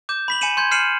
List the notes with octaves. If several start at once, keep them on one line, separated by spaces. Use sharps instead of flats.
D6 G6 E7
B5 B6 F#7
G#5 B5 C#7 D#7 E7 F#7
C6 G6 G#6
F6 C7 C#7 D#7 E7 F#7